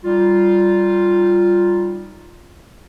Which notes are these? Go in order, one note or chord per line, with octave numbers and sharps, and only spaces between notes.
G3 D#4 F4